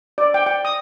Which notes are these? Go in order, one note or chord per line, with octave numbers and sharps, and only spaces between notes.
D5
G5
G5
D#6